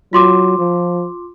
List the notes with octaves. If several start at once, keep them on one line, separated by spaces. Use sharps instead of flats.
F#3 F4 C6 D6
F3